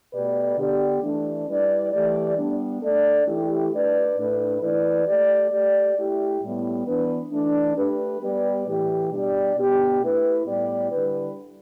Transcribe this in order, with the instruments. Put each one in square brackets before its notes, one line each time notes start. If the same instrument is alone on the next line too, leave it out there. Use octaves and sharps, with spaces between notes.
[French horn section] B2 A3 G4 B4 D5
D3 B3 G4 D5
E3 A3 D4
G3 E4 B4 D5
E3 A3 G4 D5
G3 B3 D4
A3 D4 A4 D5
E3 A3 E4 G4
A3 D4 B4 D5
A2 A3 D4 B4
E3 A3 E4 B4 D5
A3 G4 D5
A3 G4 D5
A3 E4 G4
A2 G3 B3
E3 B3 D4 B4
E3 A3 D4
A3 G4 B4
G3 B3 G4 B4 D5
A2 E3 A3 G4
B2 G3 D4 G4 D5
B2 B3 D4 G4
A3 E4 B4
A2 G3 B3 G4 D5
D3 G3 E4 B4